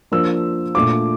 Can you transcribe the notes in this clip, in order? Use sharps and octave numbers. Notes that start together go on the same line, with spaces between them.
F3 A#3 D4 F4 E6
A#2 A3 D4 F4 D6